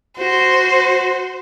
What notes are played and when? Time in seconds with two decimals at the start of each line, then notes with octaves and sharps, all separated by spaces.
0.18 F#4 C5